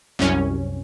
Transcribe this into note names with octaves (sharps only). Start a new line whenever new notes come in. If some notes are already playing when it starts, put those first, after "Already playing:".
C2 F#2 C#4